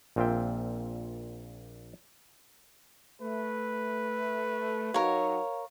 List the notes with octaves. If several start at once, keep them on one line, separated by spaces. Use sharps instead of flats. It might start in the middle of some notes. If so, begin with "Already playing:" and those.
A#1 A#2 C4 F4 E5 G5
A3 B4
F#3 D#4 F#4 A#4 C#5 F5